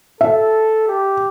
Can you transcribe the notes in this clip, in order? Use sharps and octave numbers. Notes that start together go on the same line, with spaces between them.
A4 E5
G4